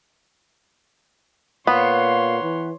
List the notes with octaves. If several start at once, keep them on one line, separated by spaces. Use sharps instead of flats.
A#2 B3 C#5 F5 C6
E3